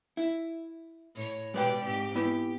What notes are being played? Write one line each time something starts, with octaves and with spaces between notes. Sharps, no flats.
E4
A2 C#5
B2 G#3 G4 B4 D5 G5
G#2 C4 G4
B3 E4 G4